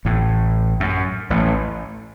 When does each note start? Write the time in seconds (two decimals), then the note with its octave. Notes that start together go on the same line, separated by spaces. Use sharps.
0.05 A1 A2
0.80 F#2
1.30 A1 A2